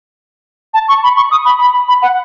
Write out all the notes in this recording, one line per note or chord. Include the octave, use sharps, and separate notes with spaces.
A5
C#6
B5
C#6
D#6
B5
B5
B5
F#5